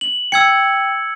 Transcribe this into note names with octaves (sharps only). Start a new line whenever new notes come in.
F#7
G5 E6 G#6 C#7